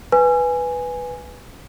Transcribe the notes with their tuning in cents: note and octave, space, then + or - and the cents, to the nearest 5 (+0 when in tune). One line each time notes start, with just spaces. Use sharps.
B4 +0 G#5 +0